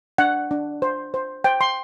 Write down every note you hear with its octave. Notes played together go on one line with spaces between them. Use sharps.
D4 F#5
D4
C5
C5
C5 G5
C6